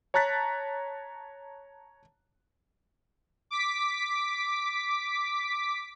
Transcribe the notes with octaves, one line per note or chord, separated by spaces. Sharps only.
C#5 A5 A#5 F#6 A6 B6
D6 B6